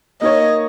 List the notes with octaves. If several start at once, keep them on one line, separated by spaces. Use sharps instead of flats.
A#3 D#4 A#4 C#5 D#5